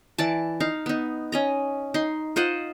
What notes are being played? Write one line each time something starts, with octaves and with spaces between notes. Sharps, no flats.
E3 D5 A5
D#4 F5
B3 D#4
C#4 D#5 A#5
D#4 C6
F4 C5 D#5 F#5